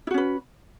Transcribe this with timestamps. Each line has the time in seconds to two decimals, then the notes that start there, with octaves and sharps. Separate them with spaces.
0.07 E4
0.11 F#4
0.14 C#4
0.18 B4